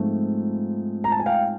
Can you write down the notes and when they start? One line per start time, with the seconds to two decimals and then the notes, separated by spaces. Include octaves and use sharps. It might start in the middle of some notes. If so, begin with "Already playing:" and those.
Already playing: G#2 F3 A3 C4
1.04 A#5
1.12 A5
1.20 G#5
1.26 F5 G5